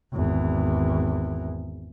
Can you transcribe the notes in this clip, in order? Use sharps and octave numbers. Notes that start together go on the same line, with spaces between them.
G#1 E2